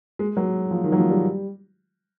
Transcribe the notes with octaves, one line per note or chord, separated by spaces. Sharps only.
G#3
F#3
F3
D#3
F#3
F3
G3